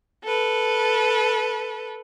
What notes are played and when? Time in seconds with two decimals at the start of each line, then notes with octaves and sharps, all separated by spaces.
0.24 A4 B4